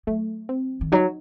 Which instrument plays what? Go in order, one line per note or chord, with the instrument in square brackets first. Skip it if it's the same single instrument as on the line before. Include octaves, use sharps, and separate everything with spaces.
[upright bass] F#3 [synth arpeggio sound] A3
[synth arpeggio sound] C4
[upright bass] D#3
[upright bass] F#3 [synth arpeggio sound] D#4